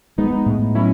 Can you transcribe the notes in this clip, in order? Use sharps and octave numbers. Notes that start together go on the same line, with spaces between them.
G#3 B3 D#4
A2
F#3 C#4 E4